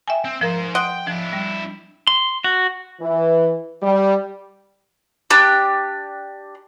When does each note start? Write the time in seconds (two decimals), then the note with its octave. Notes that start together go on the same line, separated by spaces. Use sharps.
0.08 E5 G5 G#5
0.25 C4
0.41 G#2 F3 A#4 C5 A#5
0.75 D#5 F#5 G5 C6
1.07 F3 D4 E4
1.33 G3
2.07 C6
2.44 F#4
3.01 E3
3.83 G3
5.30 D4 G4